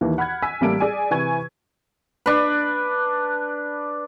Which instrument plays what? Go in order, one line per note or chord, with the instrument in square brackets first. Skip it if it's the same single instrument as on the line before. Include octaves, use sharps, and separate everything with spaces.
[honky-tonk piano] D#2 E3 A#3
F#5 B5 F6 F#6 G#6
G#5 E6 B6
A1 G3 A3 A#3 A5 D7
G#4 D5 G#5
C3 E3 B4 G#5 C#6 G#6
[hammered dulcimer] D4 B4